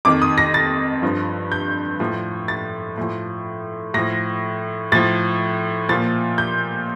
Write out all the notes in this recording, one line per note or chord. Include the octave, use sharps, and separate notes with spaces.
F2 D#3 D6
D#6
A#6
A6
G2 F3
G6
A2 F3
A6
A2 F3
A2 F3 A#6
A2 F3 A6
A#2 F3 A6
G6